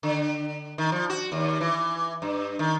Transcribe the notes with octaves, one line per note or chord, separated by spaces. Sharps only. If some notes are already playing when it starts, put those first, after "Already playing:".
D3
D#3
F3
F#4
D#2
E3
G2
D#3